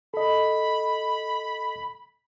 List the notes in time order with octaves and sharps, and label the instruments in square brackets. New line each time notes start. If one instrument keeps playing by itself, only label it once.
[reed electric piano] A4 D#5 [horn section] B5